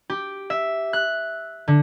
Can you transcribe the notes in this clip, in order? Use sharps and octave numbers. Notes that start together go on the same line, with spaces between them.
G4
E5
F#6
D3